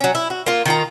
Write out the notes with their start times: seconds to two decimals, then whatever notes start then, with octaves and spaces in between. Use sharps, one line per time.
0.01 F#3 C#4
0.15 E4
0.30 F#4
0.46 A#3 F4
0.66 D#3 F4 A#5